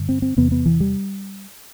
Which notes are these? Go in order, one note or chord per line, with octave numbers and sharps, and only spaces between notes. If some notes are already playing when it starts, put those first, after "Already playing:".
Already playing: G2 D3
C4
C4
E2 C3 B3
B3
E3
G3